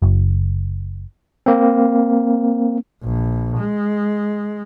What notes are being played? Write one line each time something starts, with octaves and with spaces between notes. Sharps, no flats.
F#1
A#3 C4
A#1
G#3